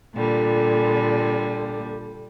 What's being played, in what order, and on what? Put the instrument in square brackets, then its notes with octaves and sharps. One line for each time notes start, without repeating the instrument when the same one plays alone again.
[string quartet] A#2 D3 G3